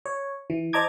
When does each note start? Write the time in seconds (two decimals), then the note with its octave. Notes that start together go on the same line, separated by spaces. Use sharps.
0.06 C#5
0.50 E3
0.73 C5 D#5 A5 A#5 D6 G#6